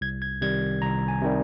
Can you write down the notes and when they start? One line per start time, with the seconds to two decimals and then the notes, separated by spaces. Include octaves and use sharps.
0.01 C2 G#6
0.22 G#6
0.41 C3 D#3 G3 G#6
0.82 C2 A#5
1.08 G#5
1.22 C3 D#3 G3